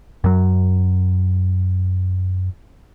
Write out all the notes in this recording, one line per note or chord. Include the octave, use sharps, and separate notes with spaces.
F#2 F#3